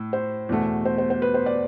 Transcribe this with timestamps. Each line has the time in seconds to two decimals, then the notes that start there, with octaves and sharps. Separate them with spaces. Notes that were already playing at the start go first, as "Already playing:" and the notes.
Already playing: A2
0.13 C5
0.49 E2 B2 A3
0.85 C5
0.98 C5
1.10 C5
1.22 B4
1.34 C5
1.46 D5